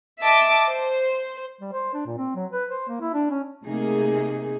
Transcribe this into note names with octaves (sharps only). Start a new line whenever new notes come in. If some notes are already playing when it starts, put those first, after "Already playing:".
D#5 E5 A5 D6
C5
G3
C5
D4
A#2
C4
F#3
B4
C5
A#3
E4
D4
C#4
C3 A3 A#3 D#4 G#4